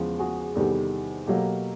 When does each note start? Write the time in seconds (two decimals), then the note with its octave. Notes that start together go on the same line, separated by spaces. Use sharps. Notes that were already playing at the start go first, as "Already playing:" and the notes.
Already playing: E2 C#3 F3 G#3 B3
0.19 F#4 G#4
0.55 E2 C3 D#3 G3 B3 G4 A4
1.27 B2 F#3 A#3 G4 A4